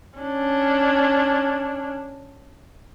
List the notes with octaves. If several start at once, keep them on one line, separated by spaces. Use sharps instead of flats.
C#4 D4